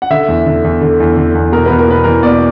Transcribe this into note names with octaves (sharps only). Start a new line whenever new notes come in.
F#5
D3 E5
E2
D3
E2
D3
E2
D3
E2
B2 A#4
E2 B4
A#4
B2 B4
E2 A#4
B2 D5